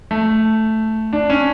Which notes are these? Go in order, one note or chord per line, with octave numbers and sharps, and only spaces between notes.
A3
D4
C#4